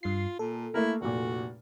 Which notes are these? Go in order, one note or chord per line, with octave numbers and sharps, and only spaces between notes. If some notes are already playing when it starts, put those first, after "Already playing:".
G2 F4 C7
A#2 A4
A3 A#3 E4 A#4
F1 A#2 F#4